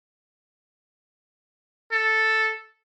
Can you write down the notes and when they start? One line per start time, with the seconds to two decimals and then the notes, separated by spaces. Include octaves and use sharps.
1.92 A4